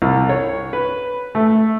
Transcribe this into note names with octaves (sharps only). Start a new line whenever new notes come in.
C2
C#5
B4
A3